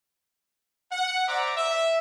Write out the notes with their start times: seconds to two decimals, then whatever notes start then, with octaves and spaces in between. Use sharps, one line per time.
0.92 F#5
1.27 C5 D5 E5 A#5 D6
1.56 E5